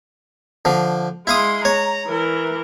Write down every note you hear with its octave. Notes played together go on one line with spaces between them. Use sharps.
D3 F3
G#3 E4 F5 C6 D#6
C#5 A#5
E3 A#4